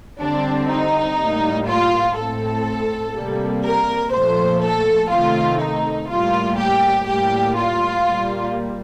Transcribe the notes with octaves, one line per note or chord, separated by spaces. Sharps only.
D3 G3 C4 D4
D#4
A2 G3 A#3
F4
A2 A3 C4 A4
C3 G3 A#3
A#4
A#2 F3 A3 C5
A4
C3 D#3 A3 C4 F4
D#4
A2 G3 A#3 F4
G4
A2 G3 A#3 G4
F4
A#2 G3 A#3